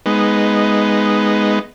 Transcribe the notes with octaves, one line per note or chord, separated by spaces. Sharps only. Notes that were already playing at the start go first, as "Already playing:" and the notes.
G#3 B3 D#4